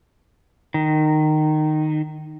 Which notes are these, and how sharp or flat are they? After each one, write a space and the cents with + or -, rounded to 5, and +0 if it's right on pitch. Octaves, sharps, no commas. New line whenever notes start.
D#3 -15